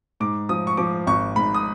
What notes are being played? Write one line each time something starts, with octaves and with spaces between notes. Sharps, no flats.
G#2 D6
F3 D#6
C#6
F3 D6
G#1 C#6
G#2 B5
D#6